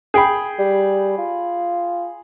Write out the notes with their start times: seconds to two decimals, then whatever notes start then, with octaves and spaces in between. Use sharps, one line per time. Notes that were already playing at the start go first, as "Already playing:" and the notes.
0.14 G#4 G5 B5
0.59 G3
1.18 F4